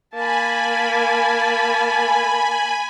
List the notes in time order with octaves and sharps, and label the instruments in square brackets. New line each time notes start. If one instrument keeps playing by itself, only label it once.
[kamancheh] A#3 A5 [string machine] G#5 B5